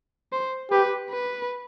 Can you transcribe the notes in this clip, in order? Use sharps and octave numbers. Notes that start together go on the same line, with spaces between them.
C5
G4 B4
B4